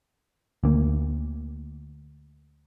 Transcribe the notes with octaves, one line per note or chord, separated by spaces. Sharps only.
D2 A#3